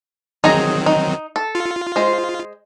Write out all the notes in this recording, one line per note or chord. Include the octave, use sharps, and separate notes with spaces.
D#3 F#3 C4 D#4 G#4 A#5
D#4
A4
F4
G#3 C5